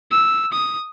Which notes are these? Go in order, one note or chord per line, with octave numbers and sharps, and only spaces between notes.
E6
D#6